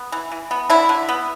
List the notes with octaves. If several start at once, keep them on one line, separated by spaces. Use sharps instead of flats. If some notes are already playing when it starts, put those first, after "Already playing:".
Already playing: B3
E3
E3
B3
D3 E4
D3
B3